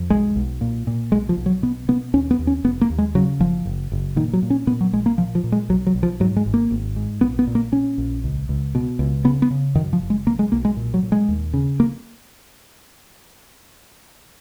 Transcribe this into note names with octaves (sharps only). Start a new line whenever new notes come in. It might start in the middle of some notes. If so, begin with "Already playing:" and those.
Already playing: F2
B1 G#3
B1
A#2
A#2
B1 G#3
F3
B1
F#3
B2 B3
B2 B3
D#2 C#4
B3
D#2
C#4
F1 B3
A#3
D#2
G#3
C#3 F#3
F#1 F3
F#1
F#1
A#2 D#3
F#3
A#2
C#4
A#2 B3
F#3
A#1 G#3
A#3
A#2 F3
F3
A#2
G#3
B1 F#3
F#3
B1
F3
G#2 F#3
G#3
G#1
A#3
G#1
G#2
A#1 B3
B3
A#2
A#3
A#2 C#4
A#1
C#2
C#2
B2
C#2
C#3 B3
B3
C#3
F#2 D#3
F3
F#1
G#3
B1 A#3
G#3
B1 A#3
G#3
A#2
F#3
A#2
G#3
D#2
C#3
A#3